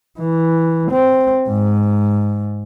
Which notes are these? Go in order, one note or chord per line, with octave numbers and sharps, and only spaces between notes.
E3
C4
G#2